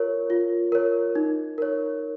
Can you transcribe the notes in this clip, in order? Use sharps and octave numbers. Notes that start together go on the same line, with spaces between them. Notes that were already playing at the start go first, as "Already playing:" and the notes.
Already playing: F4 A#4 C#5
F4
A#4 C#5
D#4
A#4 C#5